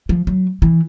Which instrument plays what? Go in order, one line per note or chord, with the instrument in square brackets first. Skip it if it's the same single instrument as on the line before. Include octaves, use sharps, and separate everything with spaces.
[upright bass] F3
F#3
E3